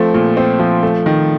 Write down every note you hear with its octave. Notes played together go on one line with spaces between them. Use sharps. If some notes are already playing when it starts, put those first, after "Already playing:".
Already playing: F3 A3 C4
A#2
C4
F3
A3
D#3